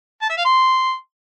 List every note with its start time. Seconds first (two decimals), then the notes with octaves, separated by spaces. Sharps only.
0.22 A5
0.30 E5
0.37 F5
0.45 C6